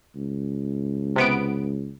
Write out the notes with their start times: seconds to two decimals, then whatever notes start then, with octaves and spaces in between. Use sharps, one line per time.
0.16 C#2
1.16 C3 B3 D7